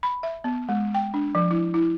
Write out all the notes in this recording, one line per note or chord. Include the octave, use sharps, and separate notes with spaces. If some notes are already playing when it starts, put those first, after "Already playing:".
B5
E5
B3
G#3
G5
D4
F3
E4
E4